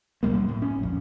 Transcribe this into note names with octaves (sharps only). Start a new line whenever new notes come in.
C#2 B2 G3 A#3
F#2
A2
C#4
A#1 F2